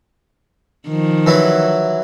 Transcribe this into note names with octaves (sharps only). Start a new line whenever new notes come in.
D#3 F3
E3 F#3 E4